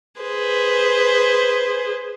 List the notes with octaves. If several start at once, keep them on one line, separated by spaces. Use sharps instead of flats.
G#4 B4 C5